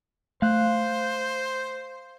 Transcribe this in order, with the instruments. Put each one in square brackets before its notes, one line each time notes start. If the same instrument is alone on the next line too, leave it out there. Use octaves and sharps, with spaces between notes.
[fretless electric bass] A3 [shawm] C5 [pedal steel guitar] F5 F#6